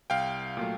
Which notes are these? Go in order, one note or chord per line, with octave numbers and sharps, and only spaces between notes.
C2 F5 G5
A#2 F#3 A3